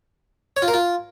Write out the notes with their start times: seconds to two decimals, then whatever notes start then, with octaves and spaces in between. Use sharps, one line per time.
0.57 C#5
0.62 F4
0.68 A#4
0.74 F4